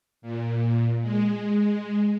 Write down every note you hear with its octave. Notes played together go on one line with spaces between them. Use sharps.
A#2
G#3